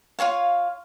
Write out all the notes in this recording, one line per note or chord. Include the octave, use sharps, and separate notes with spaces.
F4 F#4 C#5 F5